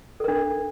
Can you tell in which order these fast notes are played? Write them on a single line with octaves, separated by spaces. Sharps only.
A4 A#4 D4